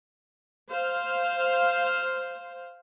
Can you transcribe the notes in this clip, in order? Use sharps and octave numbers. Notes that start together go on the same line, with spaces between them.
C5 F5